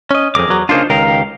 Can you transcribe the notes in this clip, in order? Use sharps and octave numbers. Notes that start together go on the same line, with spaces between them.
C#4 D#5
C2 F2 G#4 A#4 D6
E2 F#3
C#3 A#3 D4 D#4 F4 C5
C#2 D#3 G4 A#4 F5 A#5